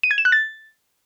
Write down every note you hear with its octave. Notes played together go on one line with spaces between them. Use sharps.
D#7
G#6
E7
F#6
A6